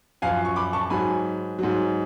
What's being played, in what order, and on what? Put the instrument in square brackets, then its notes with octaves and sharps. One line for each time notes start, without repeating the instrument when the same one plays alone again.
[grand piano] F#2 F3 F5 G#5
C#6
B5 D6
A5 C#6
G#2 F#3 G#5 B5
G#2 F#3